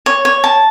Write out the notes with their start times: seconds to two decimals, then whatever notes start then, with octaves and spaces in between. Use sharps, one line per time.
0.06 C#5
0.25 C#5
0.44 A5